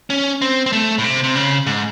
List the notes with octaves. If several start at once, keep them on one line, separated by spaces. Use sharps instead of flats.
C#4
C4
C4
A3
A2
C3
C3
C#3
G#2